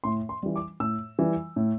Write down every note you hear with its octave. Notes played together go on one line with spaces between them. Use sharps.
A2 C6
C6
E3 G3
D6
A2 E6
E3 G3
A2